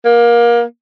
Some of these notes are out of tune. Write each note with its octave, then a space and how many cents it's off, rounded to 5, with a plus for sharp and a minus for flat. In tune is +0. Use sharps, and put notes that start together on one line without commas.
A#3 +25